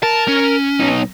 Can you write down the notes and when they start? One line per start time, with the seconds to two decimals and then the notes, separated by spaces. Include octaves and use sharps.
0.03 A#4 A5
0.28 C#4
0.80 B1 D#4